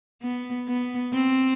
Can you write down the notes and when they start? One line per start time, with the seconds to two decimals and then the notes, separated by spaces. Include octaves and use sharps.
0.22 B3
0.68 B3
1.13 C4